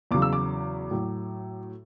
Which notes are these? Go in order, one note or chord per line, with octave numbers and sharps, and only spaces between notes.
E2 C#3 F#3 D6
E6
D6
A2 F#3